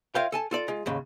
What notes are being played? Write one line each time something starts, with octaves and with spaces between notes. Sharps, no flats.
F4 A#4 C#5 E5 F5 G5
A4 G#5 A5
F4 A4 D5
G#3 F4
D#2 G#2 C#3